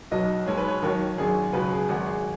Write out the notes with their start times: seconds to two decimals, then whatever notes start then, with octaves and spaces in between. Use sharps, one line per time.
0.11 B1 B2 F#3 D#5
0.46 B1 B2 G#3 C#5
0.57 B4
0.68 C#5
0.82 D#2 D#3 F#3
1.18 G#1 F#2 F#3 G#4
1.53 C#2 B2 F#3 B4
1.71 G#4
1.89 G#1 G#2 F#3 F#4
2.06 G#4